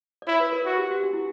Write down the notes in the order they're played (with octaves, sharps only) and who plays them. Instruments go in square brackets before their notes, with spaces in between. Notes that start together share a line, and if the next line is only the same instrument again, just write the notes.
[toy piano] D5
[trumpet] E4 [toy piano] C#5
[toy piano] B4
A#4
[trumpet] F#4
[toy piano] G4
F#4
D4
E4